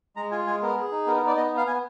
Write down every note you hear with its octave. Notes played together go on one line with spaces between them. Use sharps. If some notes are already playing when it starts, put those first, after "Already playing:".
G#3 A#5
F4 G#5
G#3 G#5
B3 A#4
G#4
D#4
B3 A#4
A#4
D#4 D5
B3 D#5
B3
F5
B3 G#5